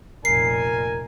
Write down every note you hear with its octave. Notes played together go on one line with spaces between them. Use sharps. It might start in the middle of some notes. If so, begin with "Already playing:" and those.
F1 A#2 A#4 G#5 C7